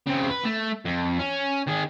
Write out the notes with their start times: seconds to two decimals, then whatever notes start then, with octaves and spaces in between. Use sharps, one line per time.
0.07 C#3 C4
0.30 B4
0.45 A3
0.85 F2
1.19 C#4
1.67 D#3 G#4